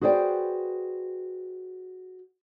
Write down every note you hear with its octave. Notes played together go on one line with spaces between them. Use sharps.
F#4 G#4 B4 C5 D5 G5